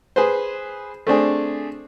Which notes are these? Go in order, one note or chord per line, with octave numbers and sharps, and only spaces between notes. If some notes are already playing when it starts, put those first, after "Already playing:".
G#4 B4 C5
A3 C4 D4 G#4